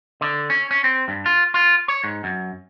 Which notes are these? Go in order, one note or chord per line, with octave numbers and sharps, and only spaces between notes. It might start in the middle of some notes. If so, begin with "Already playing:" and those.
D3
C#4
C#4
C4
G2
F4
F4
C#5
G#2
F#2